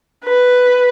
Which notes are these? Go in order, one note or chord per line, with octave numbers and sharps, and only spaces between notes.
B4